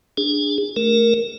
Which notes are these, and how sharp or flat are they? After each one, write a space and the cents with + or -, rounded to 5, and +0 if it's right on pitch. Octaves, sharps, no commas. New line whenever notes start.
D4 +0 G#4 -20
A3 +0 A#4 +0